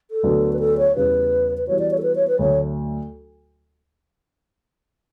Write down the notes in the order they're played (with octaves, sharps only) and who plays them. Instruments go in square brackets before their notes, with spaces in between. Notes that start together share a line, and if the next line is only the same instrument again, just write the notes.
[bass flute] A4
[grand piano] D2 D3 F#3 B3
[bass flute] B4
A4
C#5
[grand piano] E2 C#3 G3 [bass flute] B4
[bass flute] B4
[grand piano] E3 G3 B3 F#4 [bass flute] C#5
[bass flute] D5
C#5
A4
B4
C#5
B4
[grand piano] D2 D3 F#3 A3 [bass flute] C#5